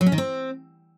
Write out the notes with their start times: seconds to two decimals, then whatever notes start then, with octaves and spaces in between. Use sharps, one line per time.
0.01 F#3
0.06 C#4
0.12 D#3
0.18 C4